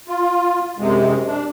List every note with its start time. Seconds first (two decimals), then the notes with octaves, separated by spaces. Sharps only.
0.08 F4
0.78 F#2 C3 G#3
1.27 D4